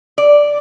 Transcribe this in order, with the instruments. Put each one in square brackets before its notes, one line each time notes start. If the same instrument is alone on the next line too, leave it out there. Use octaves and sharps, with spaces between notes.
[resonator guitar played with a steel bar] D5